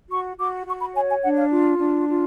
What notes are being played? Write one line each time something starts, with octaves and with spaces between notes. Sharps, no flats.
F#4 C#6
F#4 D6
F#4 C#6
B5
C#5 G#5
G#5
D4 F#5
F5
F4
D4
F4